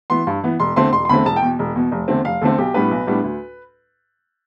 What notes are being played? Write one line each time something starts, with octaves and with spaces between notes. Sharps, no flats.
E3 B3 C6
G2
E3 B3
E1 C6
E2 D3 A3 C4 C6
E1 C6
C6
E2 D3 A3 C4 B5
E1 A5
G5
E2 B2
E1
E2 B2
F1
E2 D3 A3 C4
F1 F5
E2 D3 A3 C4 A4
B1 G4
A2 G3 B3 D4 B4
B1
A2 G3 B3 D4
D2